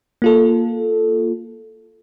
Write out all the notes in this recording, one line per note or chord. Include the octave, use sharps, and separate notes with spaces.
A#3 F4 A4